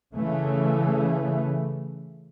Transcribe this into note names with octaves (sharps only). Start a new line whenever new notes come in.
C#3 E3 A3